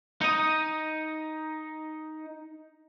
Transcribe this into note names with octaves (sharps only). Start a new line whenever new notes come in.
D#4 D#5